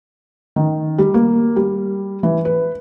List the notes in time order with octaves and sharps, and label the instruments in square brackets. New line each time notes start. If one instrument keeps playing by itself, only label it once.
[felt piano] D#3
G3
A#3
G3
E3
B4